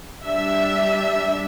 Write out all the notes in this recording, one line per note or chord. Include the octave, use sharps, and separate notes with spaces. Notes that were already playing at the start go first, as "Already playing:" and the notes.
G3 D4 E5